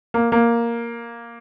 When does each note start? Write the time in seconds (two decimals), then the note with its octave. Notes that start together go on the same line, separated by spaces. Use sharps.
0.14 A#3
0.32 A#3